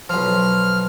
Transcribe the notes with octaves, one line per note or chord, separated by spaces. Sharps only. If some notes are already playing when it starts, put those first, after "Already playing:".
B1 F3 F6